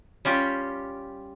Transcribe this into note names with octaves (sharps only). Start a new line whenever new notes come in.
G3 C#4 F4 G4